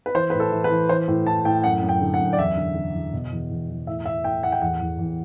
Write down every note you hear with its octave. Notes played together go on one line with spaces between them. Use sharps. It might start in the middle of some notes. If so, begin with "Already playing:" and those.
B4
E3 C5
A2 B4
A4
E3
B4
E3
E3 C5
A2
E3 A5
A2 G5
F#2 F#5
F#2
G5
D3
F#5
F#2
D5
E2 E5
D3
D3
E2
B2
E2
E2
E2
A2 E5
A2 E5
A2 G5
A2 F#5
G5
E2 F#5
E2
E2